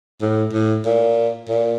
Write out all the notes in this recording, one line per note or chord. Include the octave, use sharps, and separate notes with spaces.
A2
A2
A#2
A#2